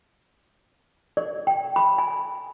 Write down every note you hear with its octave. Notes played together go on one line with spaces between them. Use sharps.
D5
G5
B5
G#5